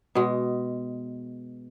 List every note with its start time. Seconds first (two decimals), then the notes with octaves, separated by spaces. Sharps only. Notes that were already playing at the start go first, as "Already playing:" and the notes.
0.15 B2 G#3